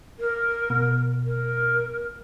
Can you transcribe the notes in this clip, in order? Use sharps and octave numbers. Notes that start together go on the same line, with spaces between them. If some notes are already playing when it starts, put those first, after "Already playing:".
A#4
B2
A#4